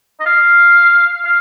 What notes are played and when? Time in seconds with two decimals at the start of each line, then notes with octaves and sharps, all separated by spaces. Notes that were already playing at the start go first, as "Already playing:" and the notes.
0.20 D#5
0.26 F5
1.25 F5